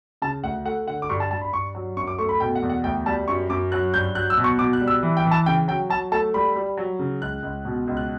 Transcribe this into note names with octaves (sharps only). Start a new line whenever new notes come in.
C#3 A5
D2 F#5
A3 F#5
D3 F#5
D6
G2 C#6
A5
G2 A5
B5
G2 C#6
F#3
F#2 C#6
D6
A3 C#6
B5
B2 G5
F#5
E2
F#5
D2 G5
G3 A5
F#2 C#6
F#2 D6
F#3 F#6
G2 G6
F#3 F#6
E6
B2
C#6
B2 D6
F#6
G3
E6
E3
G5
E3
A5
C#3 G5
F#3 G5
F#3 A5
A3 A5
G3 B5
G3
F#3
C#3
C#2 F#6
C#2
B2
C#2
F#6